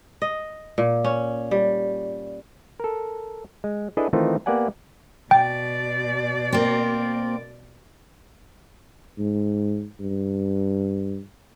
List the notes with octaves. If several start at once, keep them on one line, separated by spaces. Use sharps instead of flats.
D#5
A#2
C#4
G3
A4 A#4
G#3
D4 E4 G#4 A4 B4 D#5
D#3 E3 A3 C4 D#4 F4
A#3 B3 G4 D5 F#5 G#5
B2 D5 G5
A#3 C4
G#2
G2